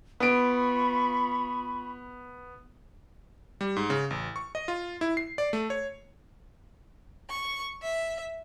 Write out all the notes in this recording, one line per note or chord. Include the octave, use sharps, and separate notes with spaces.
B3 F4 B5 C#6 D7
G3
G#2
C#3
A1
C#6
D#5
F4
E4
C7
D5
A3
C#5
C#6
E5